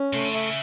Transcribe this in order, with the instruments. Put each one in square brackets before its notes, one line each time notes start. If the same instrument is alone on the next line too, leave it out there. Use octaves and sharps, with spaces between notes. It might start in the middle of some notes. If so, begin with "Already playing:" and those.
Already playing: [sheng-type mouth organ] C#4
[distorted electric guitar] C3 [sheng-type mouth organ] A3
[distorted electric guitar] D3
[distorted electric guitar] C#3 [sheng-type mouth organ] E5